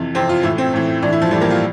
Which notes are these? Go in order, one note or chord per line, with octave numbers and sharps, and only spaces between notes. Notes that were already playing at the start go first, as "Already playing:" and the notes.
Already playing: F2 C3 E3
F2 C3 E3 C4
F4
A2 E3 E4
C4
A2 E3
A2 E3 D4
E4
F3
A2 E3 G3
A#3
F4